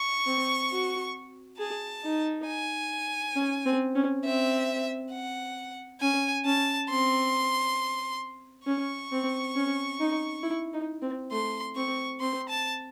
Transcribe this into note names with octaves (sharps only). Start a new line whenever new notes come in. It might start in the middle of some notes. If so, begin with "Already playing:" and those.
Already playing: C#6
C4
F#4
G#4 A5
D#4
G#5
C#4
C4
C#4
C4 E5
F#5
C#4 G#5
C#4 A5
C4 C6
C#4 C#6
C4
C#4
D#4
E4
D#4
C4
A3 C6
C4 C#6
C4 C6
A5